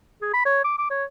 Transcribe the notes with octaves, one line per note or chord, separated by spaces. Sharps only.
G#4
B5
C#5
D6
D6
C#5